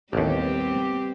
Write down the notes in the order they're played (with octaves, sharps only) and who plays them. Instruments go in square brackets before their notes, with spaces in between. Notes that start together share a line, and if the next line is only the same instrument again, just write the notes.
[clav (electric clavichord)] A1 D#2 [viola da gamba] G3 B3 C4 [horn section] G4